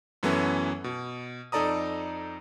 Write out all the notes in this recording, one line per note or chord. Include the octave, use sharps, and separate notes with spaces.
F#2 E3 F#3 A3 B3 C#4
B2
F2 D#4 A4 D5 A#5 D#6